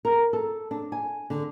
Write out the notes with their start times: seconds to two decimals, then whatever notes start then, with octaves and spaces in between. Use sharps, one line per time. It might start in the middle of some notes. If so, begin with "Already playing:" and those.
0.05 A#4
0.33 A4
0.71 D4
0.92 G#5
1.30 D3